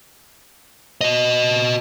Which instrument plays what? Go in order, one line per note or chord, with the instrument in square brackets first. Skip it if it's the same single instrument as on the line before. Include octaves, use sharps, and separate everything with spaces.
[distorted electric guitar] F#4 D#5